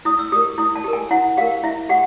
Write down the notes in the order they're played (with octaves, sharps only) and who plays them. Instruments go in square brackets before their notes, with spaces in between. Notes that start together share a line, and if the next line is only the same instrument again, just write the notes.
[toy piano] E4 D#6
E6
G4 D#6
A#4
E4 D#6
A5
G4 A#4
G#5
E4 F#5
G4 F5
A#4
E4 E5
G4 F#5